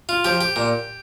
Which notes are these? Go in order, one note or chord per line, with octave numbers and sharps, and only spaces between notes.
F4
F3 G4
G4
A#2